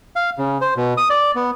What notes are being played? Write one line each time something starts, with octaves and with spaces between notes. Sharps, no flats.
F5
C#3
C5
B2
D#6
D5
B3